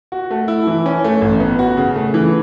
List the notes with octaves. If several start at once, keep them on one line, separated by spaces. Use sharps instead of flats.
F#4
A3
E4
E3
C#4
A3
A1
B3
F#4
C#3
A3
E3